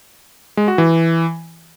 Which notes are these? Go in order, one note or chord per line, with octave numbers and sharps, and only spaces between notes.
G#3
F#4
E3